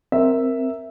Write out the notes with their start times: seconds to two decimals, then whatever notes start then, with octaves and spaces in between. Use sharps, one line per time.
0.12 C4 A#4 E5